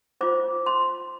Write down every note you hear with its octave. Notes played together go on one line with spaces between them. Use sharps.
F4 C5 D6
C6